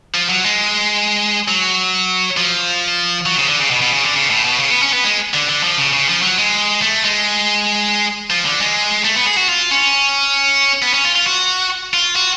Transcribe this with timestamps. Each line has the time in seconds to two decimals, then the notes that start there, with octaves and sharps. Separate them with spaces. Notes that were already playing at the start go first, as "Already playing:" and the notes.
0.14 F3
0.29 F#3
0.44 G#3
1.48 F#3
2.37 F3
3.26 F#3
3.37 C#3
3.48 D3
3.59 C#3
3.71 B2
3.82 B2
3.93 C#3
4.04 D3
4.15 C#3
4.30 A2
4.45 B2
4.60 C#3
4.70 B3
4.82 C#4
4.93 B3
5.04 G#3
5.34 D3
5.49 D3
5.63 F3
5.78 C#3
5.93 C#3
6.08 F3
6.22 F#3
6.38 G#3
6.82 A3
7.05 G#3
8.30 F3
8.45 D3
8.60 G#3
9.04 A3
9.16 B3
9.26 G#4
9.37 F#4
9.49 F4
9.71 C#4
10.82 B3
10.94 C#4
11.05 F4
11.15 F4
11.27 F#4
11.94 F4
12.16 F#4